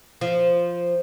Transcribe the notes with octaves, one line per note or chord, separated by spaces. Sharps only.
F3